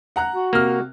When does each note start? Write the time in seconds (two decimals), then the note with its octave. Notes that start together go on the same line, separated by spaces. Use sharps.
0.16 F#5 A#5 F#6
0.34 F#4
0.53 C3 A#3 F6